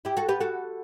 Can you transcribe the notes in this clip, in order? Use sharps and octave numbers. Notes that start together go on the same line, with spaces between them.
E4 G4
F#4 A4
G4 B4
F#4 A4